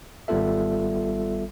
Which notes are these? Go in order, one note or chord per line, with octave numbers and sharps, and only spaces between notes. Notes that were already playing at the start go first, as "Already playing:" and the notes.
G#1 G3 B3 F4 A4 E5